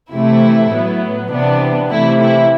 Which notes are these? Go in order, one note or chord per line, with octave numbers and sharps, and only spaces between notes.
C3 E3 A3 E4
A2 F#3 B3
C3 E3 B3 D4
C3 E3 A3 E4
E4